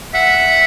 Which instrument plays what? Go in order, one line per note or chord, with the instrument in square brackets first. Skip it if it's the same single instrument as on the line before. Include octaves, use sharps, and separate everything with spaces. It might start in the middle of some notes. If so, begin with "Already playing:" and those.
[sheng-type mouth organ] E5 F#5